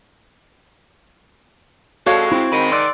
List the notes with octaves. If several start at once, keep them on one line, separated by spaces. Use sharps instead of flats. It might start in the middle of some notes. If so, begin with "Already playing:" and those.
F2 G#3 F#4 A4 C#5 F5
C4 E4
G#2 D#3 B5
D5 C6 E6 F#6